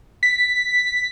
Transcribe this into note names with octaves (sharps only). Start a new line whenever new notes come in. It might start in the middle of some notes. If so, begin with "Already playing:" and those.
B6